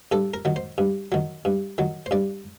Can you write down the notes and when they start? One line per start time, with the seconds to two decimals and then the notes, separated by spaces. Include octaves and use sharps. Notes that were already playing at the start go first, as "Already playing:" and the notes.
0.12 G2 A4
0.34 A#4
0.45 D#3 F#3
0.56 C5
0.78 G2
1.12 D#3 F#3
1.45 G2
1.78 D#3 F#3
2.06 C5
2.11 G2 D5